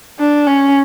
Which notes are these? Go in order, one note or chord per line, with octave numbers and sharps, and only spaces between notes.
D4
C#4